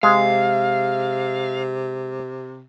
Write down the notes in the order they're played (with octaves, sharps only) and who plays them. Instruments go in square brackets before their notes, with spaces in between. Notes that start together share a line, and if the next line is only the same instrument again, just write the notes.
[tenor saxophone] C3 [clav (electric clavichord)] G#3 [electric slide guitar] F5